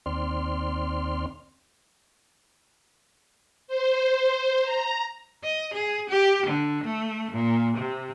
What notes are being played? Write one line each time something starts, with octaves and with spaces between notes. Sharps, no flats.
D#2 C4 D5 C6 F6
C5
A#5
D#5
G#4
G4
D3
A3
A#2
C3